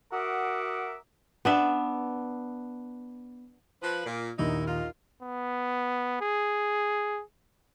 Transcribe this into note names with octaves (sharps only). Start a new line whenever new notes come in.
F#4 A#4 E5 F#5 D6 D#6
B3 D4 E5
F3 B4
A#2
A#1 D#2 D#4 E4
D#4 F4
B3
G#4